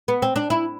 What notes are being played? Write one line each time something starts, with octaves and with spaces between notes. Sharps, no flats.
B3
C4
D4
E4